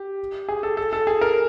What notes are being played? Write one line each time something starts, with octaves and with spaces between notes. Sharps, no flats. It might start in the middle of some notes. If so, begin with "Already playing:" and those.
Already playing: G4
G#4
A4
A4
A4
G#4
A#4